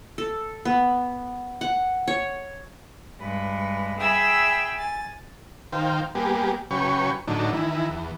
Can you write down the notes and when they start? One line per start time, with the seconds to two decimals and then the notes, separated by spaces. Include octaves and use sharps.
0.18 A4
0.65 B3
1.61 F#5
2.08 C#5
3.19 G2 G#3 B4
3.98 G#4 E5 G5 B5 E6 G#6
4.78 G#5 A6
5.73 D#3 C5 F5 G5
6.15 G3 A#3 B3 G4 G#4
6.71 C#3 F#3 B4 C#5 G5 C#6
7.28 A2 D3 F#3 D4 D#4
7.53 D#3 E3 E4
7.90 E2